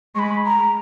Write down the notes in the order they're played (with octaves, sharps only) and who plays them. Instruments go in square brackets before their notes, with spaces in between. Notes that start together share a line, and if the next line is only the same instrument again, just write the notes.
[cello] G#3 [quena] B5 C#6
[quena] A#5